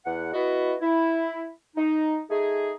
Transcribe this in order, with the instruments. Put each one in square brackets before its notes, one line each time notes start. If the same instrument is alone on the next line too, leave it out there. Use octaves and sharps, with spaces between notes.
[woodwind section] E2 F#5
B3 E4 F#4 D#5
E4
D#4
A3 D#4 G#4